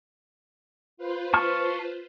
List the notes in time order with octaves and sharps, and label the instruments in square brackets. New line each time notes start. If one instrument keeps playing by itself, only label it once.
[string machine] F4 B4 C5
[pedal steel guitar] A5 C#6 F6